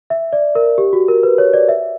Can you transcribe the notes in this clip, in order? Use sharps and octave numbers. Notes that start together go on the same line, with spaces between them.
E5
D5
A#4
G4
F#4
A#4
B4
C#5
D5
E5